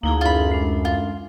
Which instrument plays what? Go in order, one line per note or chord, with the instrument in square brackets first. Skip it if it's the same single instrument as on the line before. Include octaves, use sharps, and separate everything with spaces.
[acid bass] D2 [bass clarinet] A#3 [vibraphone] D#4 E4 G#4
[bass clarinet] F#2 [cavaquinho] F4 B5
[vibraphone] G#3 D4
[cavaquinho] F4